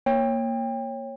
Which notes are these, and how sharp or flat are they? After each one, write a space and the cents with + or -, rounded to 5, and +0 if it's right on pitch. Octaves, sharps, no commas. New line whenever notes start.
A#3 +0 C#5 -15 G5 +25